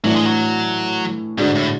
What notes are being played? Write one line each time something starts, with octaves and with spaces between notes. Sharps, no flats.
A2 E3 F#3 A3 D4
G#3
F#3
G#2 D3 G#3 D4 F#4
A2